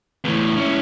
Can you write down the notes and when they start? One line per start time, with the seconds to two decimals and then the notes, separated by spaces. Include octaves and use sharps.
0.24 E2 A2
0.57 C#4 E4